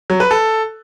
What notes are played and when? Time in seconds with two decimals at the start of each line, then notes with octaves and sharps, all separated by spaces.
0.10 F#3
0.20 B4
0.31 A4